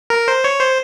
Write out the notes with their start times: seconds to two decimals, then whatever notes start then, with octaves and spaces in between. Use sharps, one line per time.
0.10 A#4
0.28 C5
0.44 C#5
0.61 C5